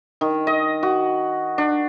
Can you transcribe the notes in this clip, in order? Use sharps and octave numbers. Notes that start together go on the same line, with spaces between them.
D#3
D#5
F#4
D4